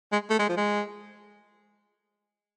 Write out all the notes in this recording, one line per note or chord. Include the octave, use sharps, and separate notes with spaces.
G#3
A3
G#3
F3
G#3